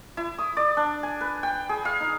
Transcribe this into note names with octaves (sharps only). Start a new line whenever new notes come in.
E4
D#6
D5
D4
G#5
B4
G5
G#4
F5
D#4